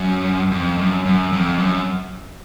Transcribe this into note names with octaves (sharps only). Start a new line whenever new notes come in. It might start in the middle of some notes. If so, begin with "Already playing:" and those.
Already playing: F#2
F2
F#2
F#2
F2
F#2